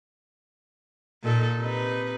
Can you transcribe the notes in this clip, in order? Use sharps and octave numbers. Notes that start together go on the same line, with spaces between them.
A#2 D#4 A4
C3 D#4 B4